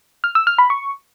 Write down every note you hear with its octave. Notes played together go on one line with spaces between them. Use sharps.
F6
E6
F6
B5
C#6